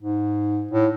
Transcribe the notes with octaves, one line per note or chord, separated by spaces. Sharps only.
G#2
A2